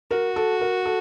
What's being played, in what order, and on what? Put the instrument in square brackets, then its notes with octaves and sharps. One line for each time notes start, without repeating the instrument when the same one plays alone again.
[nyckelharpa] F#4 [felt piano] A#4
[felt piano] A4
A#4
A4